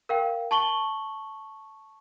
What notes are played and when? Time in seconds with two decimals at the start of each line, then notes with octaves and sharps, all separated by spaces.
0.09 A#4 F5 G5
0.51 A5 C#6 F#7 G7